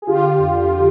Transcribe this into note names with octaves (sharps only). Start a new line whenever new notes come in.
G#4
D3 F4 G4
D3
F2
D3